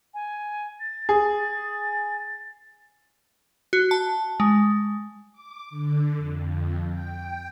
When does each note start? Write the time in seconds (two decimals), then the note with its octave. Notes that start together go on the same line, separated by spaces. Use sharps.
0.14 G#5
0.80 A6
1.09 G#4
3.73 F#4
3.91 A5
4.40 G#3
5.32 D6
5.70 D3
6.17 F2
6.90 G5